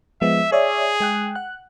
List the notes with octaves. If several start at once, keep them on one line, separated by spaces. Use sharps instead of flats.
F3 G#3 B3 E5
G#4 C#5 D5 E5
G#3 G5 F#6
F#5 F#6